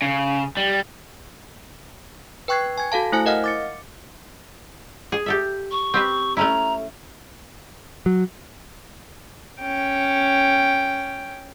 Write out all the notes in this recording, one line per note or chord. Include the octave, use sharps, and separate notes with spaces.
C#3
G3
B4 G5 C#6 F#6 G#6 C7
G#5 G#6
F#4 A4 F5 A5
A3 E4 C5 G#5 F#6
A#4 D#5 F5 F#5 F6
D6 A6 C#7
G#4
G4 A4 E5
C#6
C4 G4 B4
A3 C#4 E4 A#5
F#3
C#4 G5